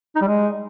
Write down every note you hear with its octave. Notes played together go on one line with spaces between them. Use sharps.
D#4
G3
G#3